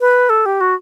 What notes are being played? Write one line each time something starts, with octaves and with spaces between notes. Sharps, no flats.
B4
A4
G4
F#4